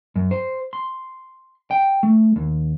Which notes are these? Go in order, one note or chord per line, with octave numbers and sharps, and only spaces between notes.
F#2
C5
C6
G5
A3
D#2